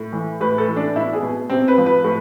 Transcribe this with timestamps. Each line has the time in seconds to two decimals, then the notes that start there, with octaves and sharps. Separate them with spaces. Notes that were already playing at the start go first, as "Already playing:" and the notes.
Already playing: A2
0.13 E3
0.41 A2 B4
0.58 A4
0.68 E3
0.76 D4
0.96 B2 E4
1.13 G#4
1.23 B2
1.49 C3 C4
1.68 B4
1.78 F3
1.86 B4
2.04 A2